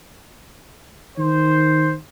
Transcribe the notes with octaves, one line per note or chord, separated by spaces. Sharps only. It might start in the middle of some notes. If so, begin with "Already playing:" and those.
D#3 C5